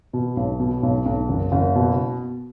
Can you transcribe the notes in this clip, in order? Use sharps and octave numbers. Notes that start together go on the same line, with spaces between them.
B2
B1
B2
B1
B1
F#1
F#1
B2